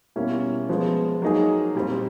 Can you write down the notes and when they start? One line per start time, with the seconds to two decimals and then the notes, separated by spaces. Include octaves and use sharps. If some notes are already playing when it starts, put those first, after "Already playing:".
0.16 B2 G3 A#3 C#4 E4
0.69 F3 G#3 B3
1.22 F#3 A#3 D#4 G#4
1.75 A#2 G3 C4